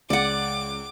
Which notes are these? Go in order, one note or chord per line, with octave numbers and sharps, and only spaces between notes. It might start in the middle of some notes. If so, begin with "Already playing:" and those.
C#2 D5 F#5 D6